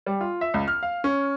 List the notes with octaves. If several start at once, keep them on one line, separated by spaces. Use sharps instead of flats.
G3
F4
E5
C#2
F6
F5
C#4